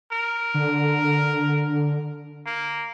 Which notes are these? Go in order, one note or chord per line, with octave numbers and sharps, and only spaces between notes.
A#4
D3
A#3